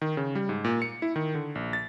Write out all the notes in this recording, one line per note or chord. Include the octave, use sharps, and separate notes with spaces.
D#3
C#3
G3
G#2
A#2
C#7
E4
D#3
D3
A#1
A6